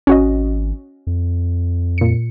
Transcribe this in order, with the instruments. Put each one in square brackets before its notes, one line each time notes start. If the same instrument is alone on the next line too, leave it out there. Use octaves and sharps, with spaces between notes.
[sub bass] G#1 [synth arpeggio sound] C#4 F#4 D#5
[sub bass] F2
[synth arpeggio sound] A#2 C#7